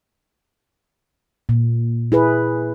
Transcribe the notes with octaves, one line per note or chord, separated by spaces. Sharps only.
A#2
E4 G#4 B4